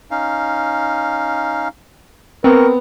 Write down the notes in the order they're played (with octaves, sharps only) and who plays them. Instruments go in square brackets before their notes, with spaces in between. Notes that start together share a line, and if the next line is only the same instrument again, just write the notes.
[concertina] C#4 D#4 F5
[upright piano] B3 [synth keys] C4 [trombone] A#4 [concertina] C#6